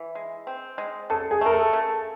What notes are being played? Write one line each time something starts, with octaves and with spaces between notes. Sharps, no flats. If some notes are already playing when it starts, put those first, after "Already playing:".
Already playing: E3
G#3
C4
G#3
C#3 A4
G#4
A3 A#4
A4
C#3